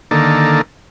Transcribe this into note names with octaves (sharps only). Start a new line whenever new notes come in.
D3 D#3 A#3 A4